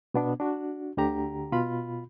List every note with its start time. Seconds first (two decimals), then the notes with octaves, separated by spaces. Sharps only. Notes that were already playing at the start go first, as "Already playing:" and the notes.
0.14 B2 B3 D4
0.40 D4 F#4
0.97 D2 D3 G4 A#5
1.52 B2 F4 B5